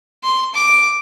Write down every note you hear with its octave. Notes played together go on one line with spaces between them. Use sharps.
C6
D6